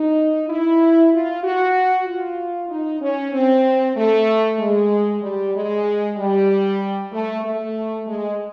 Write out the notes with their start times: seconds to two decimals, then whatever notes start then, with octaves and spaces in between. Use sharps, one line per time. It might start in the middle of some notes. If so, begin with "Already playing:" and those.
Already playing: D#4
0.49 E4
1.13 F4
1.44 F#4
2.07 F4
2.70 D#4
3.01 C#4
3.33 C4
3.96 A3
4.59 G#3
5.22 G3
5.54 G#3
6.17 G3
7.12 A3
7.44 A3
8.07 G#3